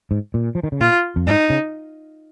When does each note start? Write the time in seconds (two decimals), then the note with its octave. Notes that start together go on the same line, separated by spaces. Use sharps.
0.11 G#2
0.34 A#2
0.55 F3
0.63 D#3
0.72 C#3
0.80 A#2 F4
1.16 F2
1.27 G#2 D#4
1.50 C#3